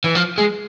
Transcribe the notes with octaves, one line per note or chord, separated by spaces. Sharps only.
E3
F3
G#3